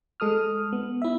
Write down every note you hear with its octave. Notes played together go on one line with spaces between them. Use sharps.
G#3 A4 D#6 F6
B3
E4 E5